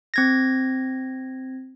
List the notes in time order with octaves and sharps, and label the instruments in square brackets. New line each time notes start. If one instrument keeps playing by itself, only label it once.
[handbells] C4 G#6 A#6